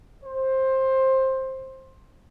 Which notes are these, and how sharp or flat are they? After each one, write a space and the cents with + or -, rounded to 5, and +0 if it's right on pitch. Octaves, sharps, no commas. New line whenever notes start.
C5 +15